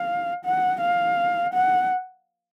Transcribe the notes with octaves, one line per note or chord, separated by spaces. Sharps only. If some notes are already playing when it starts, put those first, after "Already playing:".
Already playing: F5
F#5
F5
F#5